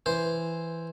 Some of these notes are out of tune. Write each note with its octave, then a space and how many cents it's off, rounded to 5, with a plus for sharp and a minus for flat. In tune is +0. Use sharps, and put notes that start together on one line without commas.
E3 +5 C5 +0